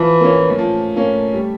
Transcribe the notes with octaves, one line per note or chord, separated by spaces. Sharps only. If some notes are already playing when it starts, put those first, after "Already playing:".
Already playing: E3 F3
A#3 C#4
F3 A3
A#3 C#4
G3